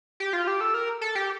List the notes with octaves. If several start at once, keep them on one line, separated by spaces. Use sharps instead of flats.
G4
F4
G4
A4
A#4
A4
G4